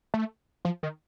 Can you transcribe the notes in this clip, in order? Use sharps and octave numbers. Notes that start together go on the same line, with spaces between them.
A3
F3
D#3